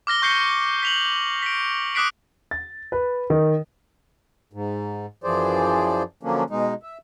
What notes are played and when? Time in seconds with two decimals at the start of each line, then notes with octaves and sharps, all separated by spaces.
0.07 D6 F6 A#6 G7
0.22 C#6 G6 C7 C#7 G7
0.83 B6 F7 F#7
1.42 B6 D7
1.95 D6 D#6 F#6 B6 C7 D7
2.51 A6
2.92 B4
3.30 D#3
4.53 G#2
5.24 F#2 E3 F3 G#4 C5 D5
6.23 D3 F3 F#3 A#3 C#4 D4
6.50 B2 G#3 D#4
6.83 E5